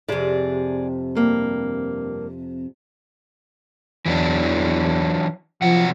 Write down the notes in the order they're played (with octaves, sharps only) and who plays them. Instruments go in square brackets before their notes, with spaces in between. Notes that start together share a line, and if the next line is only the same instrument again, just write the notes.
[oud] F2 C3 [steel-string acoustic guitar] G#4 D5
[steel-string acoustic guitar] G2 A#3
[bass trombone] E2 [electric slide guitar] E3 F#3 D4
[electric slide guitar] C3 F#3 F#5 [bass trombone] F3